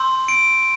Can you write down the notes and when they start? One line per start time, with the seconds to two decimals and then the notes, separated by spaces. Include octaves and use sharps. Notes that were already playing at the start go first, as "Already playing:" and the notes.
Already playing: C6 E6 G6
0.28 D7